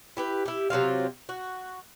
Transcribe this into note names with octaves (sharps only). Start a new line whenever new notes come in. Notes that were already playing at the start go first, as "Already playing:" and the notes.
E4 G4 B4
E4 G4
C3 F#3 C4 F4
F#4